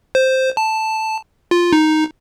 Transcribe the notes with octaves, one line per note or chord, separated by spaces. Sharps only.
C5
A5
F4
D#4